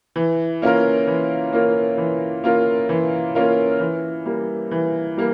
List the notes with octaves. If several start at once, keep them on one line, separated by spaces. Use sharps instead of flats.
E3
A#3 C#4 F4 A#4
E3
A#3 C#4 F4 A#4
E3
A#3 C#4 F4 A#4
E3
A#3 C#4 F4 A#4
E3
G3 A#3
E3
G3 A#3